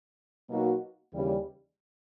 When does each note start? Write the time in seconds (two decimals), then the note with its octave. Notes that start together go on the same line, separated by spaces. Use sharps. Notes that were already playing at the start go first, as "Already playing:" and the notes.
0.50 B2 F#3 A#3 D#4 F#4
1.14 D#2 C#3 E3 G3